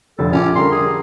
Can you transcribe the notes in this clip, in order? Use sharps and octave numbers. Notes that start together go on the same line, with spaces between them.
F1 F2 D3 A4
A#1 C#4 F4 D6
D3 G3 A#4 C6
G#4